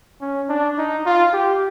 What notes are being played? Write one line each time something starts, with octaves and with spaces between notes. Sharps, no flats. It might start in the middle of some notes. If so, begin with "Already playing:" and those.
C#4
D4
D#4
F4
G4